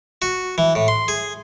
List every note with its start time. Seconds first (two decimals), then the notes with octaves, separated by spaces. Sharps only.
0.22 F#4
0.58 E3
0.75 A2
0.88 C6
1.08 G#4